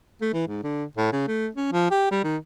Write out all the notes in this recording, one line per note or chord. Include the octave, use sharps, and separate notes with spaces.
A3
E3
G#2
D3
A2
C#3
A3
C#4
F3
G4
G3
D#3